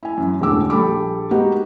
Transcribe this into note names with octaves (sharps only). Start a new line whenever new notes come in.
E4 G#5
F#2 E3
E1 A1 E2 D3 D6 E6
A#1 G3 A4 G5 B5 D6
G#3 A#3 B3 D#4 F#4 G4